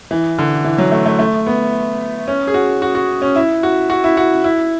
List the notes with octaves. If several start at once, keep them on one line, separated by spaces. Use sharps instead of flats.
E3
D3
E3
F#3
A3
A3
A3
B3
C#4
G#4
F#4
F#4
F#4
C#4
E4
F#4
F#4
E4
F#4
E4